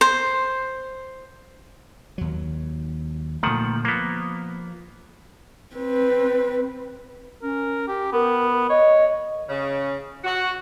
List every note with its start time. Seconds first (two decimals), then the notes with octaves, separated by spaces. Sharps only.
0.01 C5
2.18 D#2 F#3
3.43 A#2 D3 D#3 F3 A3 F#5
3.85 F3 A#3 B3
5.75 C4 B4
7.42 C#4 A#4
7.88 G4
8.13 B3 A#4
8.69 C#5 D#5
9.49 C#3
10.24 F#4